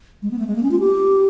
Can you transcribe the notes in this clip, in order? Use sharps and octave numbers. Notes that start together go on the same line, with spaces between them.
G#3
B3
A3
G#3
A#3
C#4
F4
G4